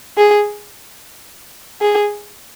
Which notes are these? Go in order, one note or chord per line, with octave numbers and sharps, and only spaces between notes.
G#4
G#4